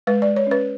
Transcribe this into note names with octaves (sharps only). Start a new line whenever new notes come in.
G#3 B4
D5
G#3
C#5
C#4 B4